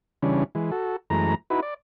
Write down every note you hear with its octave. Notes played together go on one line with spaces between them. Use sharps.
C#3 E3 G3 C#4 D4
E3 G#3
F#4 A4
F#2 E3 G#3 A3 A#5
D#4 E4 F#4 B4
D5